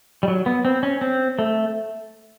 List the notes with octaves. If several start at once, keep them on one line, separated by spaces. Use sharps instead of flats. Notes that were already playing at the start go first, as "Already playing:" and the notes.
G3
F#3
B3
C4
C#4
C4
A3